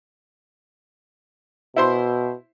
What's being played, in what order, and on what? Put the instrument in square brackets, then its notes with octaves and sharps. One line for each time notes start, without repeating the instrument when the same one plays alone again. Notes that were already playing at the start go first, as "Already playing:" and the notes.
[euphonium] B2 [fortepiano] E4 C5 C6